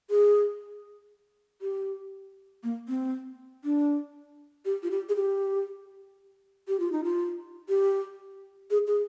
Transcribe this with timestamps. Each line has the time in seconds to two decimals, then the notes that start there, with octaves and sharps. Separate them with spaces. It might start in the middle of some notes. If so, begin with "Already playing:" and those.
0.10 G#4
1.62 G4
2.63 A#3
2.88 C4
3.64 D4
4.65 G4
4.83 F4
4.91 G4
5.09 G#4
5.16 G4
6.68 G4
6.80 F4
6.92 D#4
7.04 F4
7.69 G4
8.71 G#4
8.87 G#4